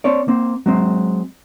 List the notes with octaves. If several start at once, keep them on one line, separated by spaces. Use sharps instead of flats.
C4 C#5 D5
A#3 C4
F#3 G#3 C4